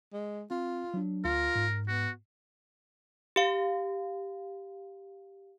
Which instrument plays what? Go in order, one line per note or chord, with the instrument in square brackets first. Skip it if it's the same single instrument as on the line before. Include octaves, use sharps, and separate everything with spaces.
[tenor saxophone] G#3
[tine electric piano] C4 [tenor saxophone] F4
[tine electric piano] F#3 D4
[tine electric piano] D2 [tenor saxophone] F4 [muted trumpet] A#4
[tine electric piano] G#2
[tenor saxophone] B3 [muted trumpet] F#4
[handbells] G4 F5